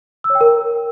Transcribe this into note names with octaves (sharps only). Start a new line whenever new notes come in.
E6
C#5
G5
A#4